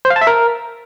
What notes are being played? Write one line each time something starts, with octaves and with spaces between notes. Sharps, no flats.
C5
F5
A5
E5
A#4